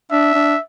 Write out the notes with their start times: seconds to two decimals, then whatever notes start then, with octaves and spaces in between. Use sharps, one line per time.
0.11 D4 E5
0.35 D4